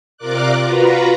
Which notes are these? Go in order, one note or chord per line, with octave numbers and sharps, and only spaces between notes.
C3 F4 A#4 D5 D6 F#6
F4 F#4 B4 A#5